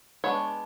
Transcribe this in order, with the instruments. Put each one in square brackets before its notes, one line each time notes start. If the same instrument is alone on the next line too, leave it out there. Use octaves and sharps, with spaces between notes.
[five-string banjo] G#3 B3 D4 C#5